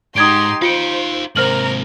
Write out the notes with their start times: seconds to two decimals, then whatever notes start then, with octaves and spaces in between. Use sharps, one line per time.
0.16 G#2 D#4 G4 C6 D#6 G#6 D7
0.62 D#4 F4 C5 F5 C#7 D7
1.36 G#2 C3 A#4 C5 F6 F#7